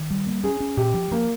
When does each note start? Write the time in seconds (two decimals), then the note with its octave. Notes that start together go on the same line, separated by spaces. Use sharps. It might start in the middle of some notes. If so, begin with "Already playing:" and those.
Already playing: D#3
0.11 G3
0.27 A#3
0.44 C#4 G#4
0.60 C#4
0.77 A#2 G4
0.94 F3
1.11 F3 A#3